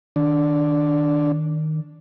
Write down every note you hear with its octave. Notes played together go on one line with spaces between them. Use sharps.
D#3 D4